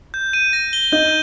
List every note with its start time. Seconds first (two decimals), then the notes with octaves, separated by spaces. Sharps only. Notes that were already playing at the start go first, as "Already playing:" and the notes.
0.14 G6
0.33 D#7
0.53 A#6
0.73 G7
0.92 D#4 D#5 G6